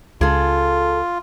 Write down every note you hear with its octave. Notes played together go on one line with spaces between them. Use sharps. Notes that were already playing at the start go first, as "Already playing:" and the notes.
C#2 F4 G#4 A4